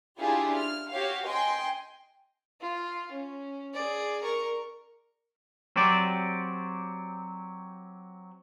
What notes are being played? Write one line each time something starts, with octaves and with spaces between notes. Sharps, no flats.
D4 E4 F4 G4 G#4
F6
F#4 G4 C#5 F5
D#5 G5 G#5 C6
F4
C#4
G#4 D5
A#4 C#6
F#3 C4 G4 D5